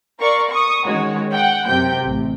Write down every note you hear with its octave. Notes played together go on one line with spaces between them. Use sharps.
A#4 D5 F5 C#6
C#6 D#6
D#3 G#3 C#4 F#4 C#5
F#5 G5
F#2 C3 G5 G6
A1